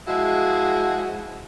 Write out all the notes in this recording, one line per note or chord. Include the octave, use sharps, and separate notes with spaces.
F3 G#3 E4 F#4 G#4